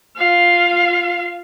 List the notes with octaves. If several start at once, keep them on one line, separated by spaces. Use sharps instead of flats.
F4 F5